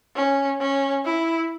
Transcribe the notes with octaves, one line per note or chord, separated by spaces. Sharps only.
C#4
C#4
E4